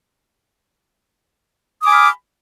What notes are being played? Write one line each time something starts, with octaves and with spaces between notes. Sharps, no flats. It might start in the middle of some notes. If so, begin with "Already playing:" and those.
G#5 B5 D6 D#6 F6